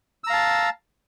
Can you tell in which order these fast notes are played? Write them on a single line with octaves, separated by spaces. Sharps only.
E6 A#5 F5 A5